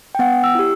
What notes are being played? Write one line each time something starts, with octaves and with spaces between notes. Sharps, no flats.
G5
B3 F#5
E6
E4 G4